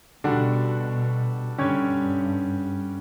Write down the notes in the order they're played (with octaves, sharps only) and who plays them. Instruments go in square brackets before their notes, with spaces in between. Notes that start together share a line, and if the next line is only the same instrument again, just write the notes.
[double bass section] B2 [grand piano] D3 G3 D4 F#4 A4
[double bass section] G2 [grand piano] D3 G3 C#4 G4 C#5